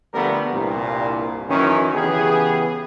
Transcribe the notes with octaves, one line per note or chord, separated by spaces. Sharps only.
D3 F3 G3 A3 B3 A#4
C2 G2 A#2
F#2 D#3 E3 C#4
C#3 E3 B3 G4 G#4